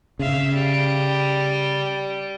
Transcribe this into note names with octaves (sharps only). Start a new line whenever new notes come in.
C#3 E5 F5
G3